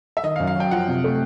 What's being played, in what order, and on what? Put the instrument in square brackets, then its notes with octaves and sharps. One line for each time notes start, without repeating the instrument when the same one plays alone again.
[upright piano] E5
[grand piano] D#3 [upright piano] D#5
[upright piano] F5
[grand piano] F#2
[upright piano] F5
[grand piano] F#3 [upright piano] G5
[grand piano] F3 [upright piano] F#5
[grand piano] C3
A3